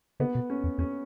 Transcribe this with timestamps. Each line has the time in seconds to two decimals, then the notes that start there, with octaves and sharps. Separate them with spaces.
0.20 C#3 B3
0.35 B2
0.50 C#4
0.64 E2
0.78 E2 C#4